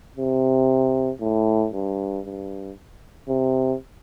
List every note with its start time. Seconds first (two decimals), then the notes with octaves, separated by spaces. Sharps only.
0.17 C3
1.21 A2
1.73 G2
2.25 G2
3.28 C3